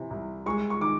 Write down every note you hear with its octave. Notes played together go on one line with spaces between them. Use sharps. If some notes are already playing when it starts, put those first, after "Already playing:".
Already playing: C3 E3
C2
G#3 C#6
C#6
D#3 D6